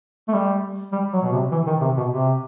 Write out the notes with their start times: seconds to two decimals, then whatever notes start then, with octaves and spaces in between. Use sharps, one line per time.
0.28 A3
0.34 G3
0.92 G3
1.13 F#3
1.22 B2
1.33 C3
1.52 E3
1.67 D#3
1.81 C3
1.97 B2
2.11 C3